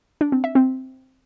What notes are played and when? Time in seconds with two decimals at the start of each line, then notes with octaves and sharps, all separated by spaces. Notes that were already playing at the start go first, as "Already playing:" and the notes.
0.21 D4
0.32 C4
0.44 E5
0.55 C4